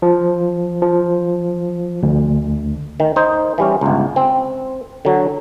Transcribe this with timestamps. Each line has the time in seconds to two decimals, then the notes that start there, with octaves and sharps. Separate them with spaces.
0.02 F3
0.82 F3
2.03 D2
3.00 D#3
3.16 D#4 C5
3.58 E3 G3 C#4
3.81 G1 C#2
4.16 C4
5.05 D3 F#3